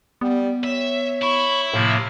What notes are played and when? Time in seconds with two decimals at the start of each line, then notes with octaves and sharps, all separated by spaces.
0.21 G3 B3
0.64 C#5 E5
1.22 E4 B5 C#6
1.73 A2 C3 F3 A#3